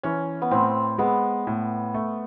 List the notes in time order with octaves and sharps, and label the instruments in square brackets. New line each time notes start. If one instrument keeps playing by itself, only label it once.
[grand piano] E3 [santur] C#4
[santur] B3
[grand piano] A2 [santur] C4
[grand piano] G#3 [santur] B3
[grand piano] A2
A3